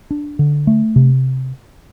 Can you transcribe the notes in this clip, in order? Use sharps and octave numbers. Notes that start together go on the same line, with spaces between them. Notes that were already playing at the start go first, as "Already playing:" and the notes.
D4
D3
A3
C3